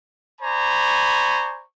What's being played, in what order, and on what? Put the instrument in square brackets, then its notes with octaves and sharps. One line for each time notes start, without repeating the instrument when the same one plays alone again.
[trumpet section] C5 D5 G#5 A#5 B5 C#6